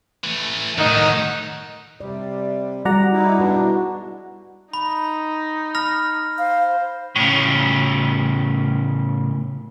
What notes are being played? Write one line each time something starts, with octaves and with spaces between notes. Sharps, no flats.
E3 A3
A2 D#3 D#4 C#5 F#5
C3 G3 D5
G3 F#4 G#4 D5 F#5 A#5
D#4 E4
B2 D4 E4 F#4 B4
D#4 B5
B5 F6 A#6
C5 F5
A2 C#3